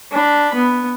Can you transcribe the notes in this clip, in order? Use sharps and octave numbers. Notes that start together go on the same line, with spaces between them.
D4 B5
B3